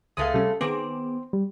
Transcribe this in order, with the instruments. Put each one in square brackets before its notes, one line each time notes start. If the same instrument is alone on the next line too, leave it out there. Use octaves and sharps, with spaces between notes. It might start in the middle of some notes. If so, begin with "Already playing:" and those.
[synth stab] C#2 D#6 [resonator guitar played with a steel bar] G#3 A3 F5
[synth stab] C3 G3 C#4 [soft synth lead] A4
[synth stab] D#3 G#4 D6 [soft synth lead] B3 [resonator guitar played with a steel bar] C4
[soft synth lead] G3